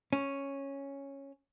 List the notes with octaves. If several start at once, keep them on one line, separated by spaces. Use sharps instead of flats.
C#4